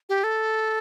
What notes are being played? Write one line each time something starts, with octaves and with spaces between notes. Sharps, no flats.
G4
A4